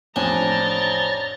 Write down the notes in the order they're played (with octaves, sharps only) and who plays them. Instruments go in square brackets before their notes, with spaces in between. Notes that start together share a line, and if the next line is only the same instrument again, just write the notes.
[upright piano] A1 F2 G#5 [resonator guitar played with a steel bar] D4 [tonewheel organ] C5 C#5 [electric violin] A#5 A6